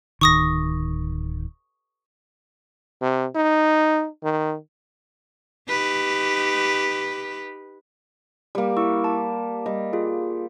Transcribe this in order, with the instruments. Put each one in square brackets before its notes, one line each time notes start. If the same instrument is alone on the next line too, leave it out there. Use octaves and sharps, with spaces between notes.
[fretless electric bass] D1 G1 D#3 [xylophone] C#6 D#6 A#6
[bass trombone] C3
D#4
D#3
[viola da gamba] D#4 G4 B4
[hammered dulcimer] G3 A#3
[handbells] E4 C#6 E6
A5
[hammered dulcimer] G3 [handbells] D#5
[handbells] F4 G#4